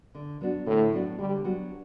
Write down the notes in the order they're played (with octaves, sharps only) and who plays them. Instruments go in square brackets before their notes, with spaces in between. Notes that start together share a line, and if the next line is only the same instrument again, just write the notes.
[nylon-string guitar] D3
F#3 B3 D4 F#4
[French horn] A2 [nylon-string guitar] D3
[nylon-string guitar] F#3 B3 D4 F#4
[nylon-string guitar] D3 [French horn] G3
[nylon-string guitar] F#3 B3 D4 F#4